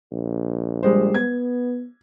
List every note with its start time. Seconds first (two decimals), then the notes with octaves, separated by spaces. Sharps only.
0.12 A#1
0.83 G3 G#3 C5
1.14 B3 G#6